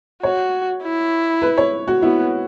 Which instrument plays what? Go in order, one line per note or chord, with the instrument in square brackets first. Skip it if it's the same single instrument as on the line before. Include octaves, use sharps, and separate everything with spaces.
[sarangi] F#4 [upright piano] C#5
[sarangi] E4
[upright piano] B4
C#5
F#4
[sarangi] B3 [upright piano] E4